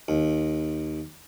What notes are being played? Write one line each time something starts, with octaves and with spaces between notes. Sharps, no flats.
D#2